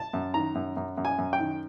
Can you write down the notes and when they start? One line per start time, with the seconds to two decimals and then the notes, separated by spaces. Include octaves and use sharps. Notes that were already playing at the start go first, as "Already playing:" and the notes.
Already playing: A5
0.13 F#2
0.34 D#3 A#5
0.55 F#2
0.77 F#2
0.97 F#2
1.05 G#5
1.18 F#2
1.33 G5
1.39 D#3